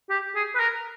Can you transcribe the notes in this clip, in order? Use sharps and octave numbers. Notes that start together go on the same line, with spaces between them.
G4
G#4
B4
A#4